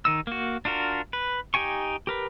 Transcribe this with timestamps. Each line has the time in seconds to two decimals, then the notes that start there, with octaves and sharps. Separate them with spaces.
0.05 D#3 D#4 E6
0.27 A#3 F#4
0.65 D4 F4 F#4 A#4
1.13 B4
1.54 D#4 G4 G5 G#5 C#6
2.07 G4 A#4 B4